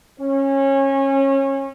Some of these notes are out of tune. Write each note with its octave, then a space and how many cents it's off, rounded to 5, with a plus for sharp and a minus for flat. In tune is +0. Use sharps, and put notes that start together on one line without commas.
C#4 -25